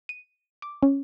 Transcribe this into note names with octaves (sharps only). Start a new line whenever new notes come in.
D#7
D6
C#4